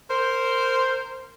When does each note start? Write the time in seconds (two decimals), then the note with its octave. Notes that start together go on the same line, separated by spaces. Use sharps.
0.09 A#4 C5